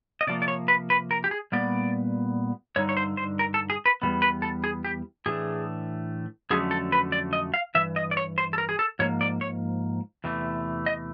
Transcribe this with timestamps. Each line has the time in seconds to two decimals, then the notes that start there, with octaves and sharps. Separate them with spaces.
0.21 D#5
0.27 C3 F3 A#3 D5
0.42 D5
0.48 C#5
0.68 B4
0.90 B4
1.11 A#4
1.24 G4
1.31 G#4
1.52 A#2 G3 B3 D5
2.76 G2 D3 G3 D#4 C#5
2.89 C#5
2.97 C5
3.17 C5
3.39 A#4
3.54 A4
3.70 G#4
3.86 B4
4.02 E2 B2 G3 B3
4.22 B4
4.42 A4
4.64 G#4
4.85 G4
5.26 A2 E3 A3 D4 G#4
6.50 F2 D3 F#3 A3 C#4 G#4
6.71 A4
6.92 B4
7.12 D5
7.33 D#5
7.54 F5
7.75 G2 E3 E5
7.96 D#5
8.11 D5
8.17 C#5
8.38 C5
8.53 A4
8.58 A#4
8.69 G#4
8.79 A4
8.99 G#2 F3 A#3 C#5
9.21 D5
9.41 C#5
10.24 E2 C3 E3 A3
10.86 D#5